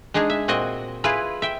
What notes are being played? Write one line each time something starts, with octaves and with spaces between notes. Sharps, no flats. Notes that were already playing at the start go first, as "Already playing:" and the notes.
G#3 D4 D#4 G#4
E5
A#2 C4 F#4 D#5
E4 F4 G#4 B4
E5 G5